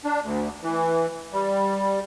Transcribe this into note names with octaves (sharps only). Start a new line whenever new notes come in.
D4
D2
E3
G3